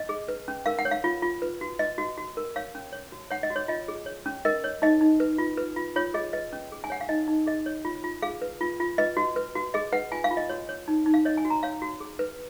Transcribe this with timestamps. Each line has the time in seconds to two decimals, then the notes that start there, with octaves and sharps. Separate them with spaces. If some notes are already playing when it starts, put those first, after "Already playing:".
Already playing: D#5
0.09 G#4
0.28 B4
0.48 C#4
0.66 A#4 F5
0.79 F#5
0.85 C#5
0.91 F5
1.04 F4
1.22 F4
1.42 B4
1.61 F#4
1.79 B4 D#5
1.98 F#4
2.18 F#4
2.37 A#4
2.56 C#5 F5
2.75 C#4
2.93 C#5
3.12 F#4
3.31 C#5 F#5
3.43 D#5
3.50 F#4
3.56 C#5
3.68 F4 D#5
3.88 G#4
4.06 C#5
4.26 C#4
4.45 A#4 D#5
4.64 C#5
4.82 D#4 D#5
5.01 D#4
5.20 B4
5.38 F4
5.57 B4
5.76 F4
5.96 F4 C#5
6.14 G#4 D#5
6.33 B4 D#5
6.53 C#4
6.72 G#4
6.84 G#5
6.90 C#5 F#5
7.01 F5
7.09 D#4 D#5
7.28 D#4
7.46 G#4 D#5
7.66 C#5
7.85 F4
8.04 F4
8.22 G#4 F5
8.42 B4
8.61 F4
8.80 F4
8.98 B4 D#5
9.17 F#4
9.36 B4
9.55 F#4
9.74 G#4 D#5
9.93 B4 F#5
10.12 F4 G#5
10.24 F5
10.31 F4
10.37 D#5
10.49 F#4 C#5
10.69 C#5
10.88 D#4
11.06 D#4
11.14 F5
11.25 C#5 D#5
11.37 G#5
11.45 F#4
11.50 A#5
11.63 C#5 F5
11.82 F#4
12.00 G#4
12.19 B4